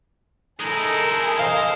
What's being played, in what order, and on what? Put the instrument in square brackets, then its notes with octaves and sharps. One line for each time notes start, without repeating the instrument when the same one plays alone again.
[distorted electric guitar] G#3 E4 [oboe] D#4 [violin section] A4 A#4 G#5
[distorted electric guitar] C5 [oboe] D#5 [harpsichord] F5